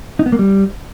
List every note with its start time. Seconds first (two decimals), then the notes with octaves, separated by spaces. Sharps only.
0.19 D#4
0.26 B3
0.32 A#3
0.39 G3